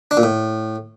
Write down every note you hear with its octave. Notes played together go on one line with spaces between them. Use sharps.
D4
A#2
A2